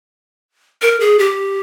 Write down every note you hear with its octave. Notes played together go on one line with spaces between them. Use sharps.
A#4
G#4
G4